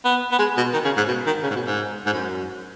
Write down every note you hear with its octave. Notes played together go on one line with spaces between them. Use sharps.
B3
B3
G#3
B2
D#3
C#3
G#2
B2
D#3
C#3
G#2
B2
G#2
G#2
F#2